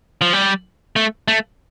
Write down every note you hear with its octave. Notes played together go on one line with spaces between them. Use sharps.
F3
G3
A3
A3